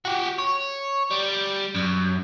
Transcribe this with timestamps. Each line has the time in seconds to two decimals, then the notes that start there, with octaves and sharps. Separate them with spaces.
0.05 F#4 G4
0.39 C#5
1.11 G3
1.75 F#2